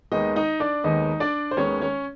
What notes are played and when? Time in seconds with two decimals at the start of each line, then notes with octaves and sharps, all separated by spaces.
0.12 D#2 D#3 G#3 B3 D#4 D#5
0.36 D#4 D#5
0.60 D4 D5
0.84 D#2 D#3 G#3 B3 D#4 D#5
1.20 D4 D5
1.51 C5
1.57 D#2 D#3 G#3 B3 C#4 C#5
1.81 C#4 C#5